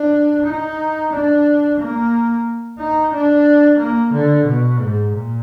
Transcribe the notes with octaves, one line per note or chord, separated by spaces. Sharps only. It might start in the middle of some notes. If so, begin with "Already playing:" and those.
Already playing: D4
D#4
D4
A#3
D#4
D4
A#3
D3
B2
G#2
A#2